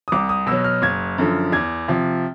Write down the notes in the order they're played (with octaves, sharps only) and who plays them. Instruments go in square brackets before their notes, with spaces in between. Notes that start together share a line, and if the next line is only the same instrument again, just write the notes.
[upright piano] D#6
C2 D6
D#6
B2 F#3 E6
F6
F#1 G#6
F#2 D3 F3
E2 G#6
C3 F3